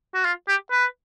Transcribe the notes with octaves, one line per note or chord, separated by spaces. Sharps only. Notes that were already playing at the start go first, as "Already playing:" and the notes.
F#4
F4
G4
B4